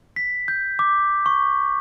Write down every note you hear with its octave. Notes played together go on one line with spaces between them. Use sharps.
B6
G6
D6
C#6